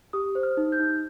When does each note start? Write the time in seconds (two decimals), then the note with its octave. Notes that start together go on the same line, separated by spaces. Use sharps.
0.13 G4 D#6
0.35 C5
0.43 F6
0.57 D#4
0.72 G6
0.80 D#4